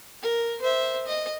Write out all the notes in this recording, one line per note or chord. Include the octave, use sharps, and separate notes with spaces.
A#4
C5 E5
D#5